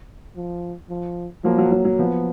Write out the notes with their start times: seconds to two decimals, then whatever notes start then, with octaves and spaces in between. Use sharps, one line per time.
0.36 F3
0.90 F3
1.44 F3 F#3 A#3
1.58 F#3
1.71 F#3
1.85 F#3
1.99 F3 B3